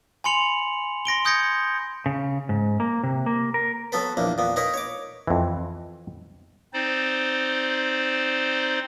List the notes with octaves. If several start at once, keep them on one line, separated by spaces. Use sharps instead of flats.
G#5 B5 C6 C#7 F7 F#7
C6 A#6 D7 G7
C6 D#6 G6 G#6 A#6 C#7
C#3
G#2
A#3
C3
A#3
A#4
F#3 B3 A4 B4
A#1 E2 A#3
A#2 B3
D#4 A#4 B4 C#5
C#5 D6
F2 E3
C4 D#4 C5 D5